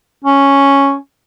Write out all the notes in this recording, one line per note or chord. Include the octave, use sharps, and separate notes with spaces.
C#4